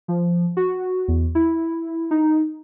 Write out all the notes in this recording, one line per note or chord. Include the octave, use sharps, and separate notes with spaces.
F3
F#4
E2
E4
D#4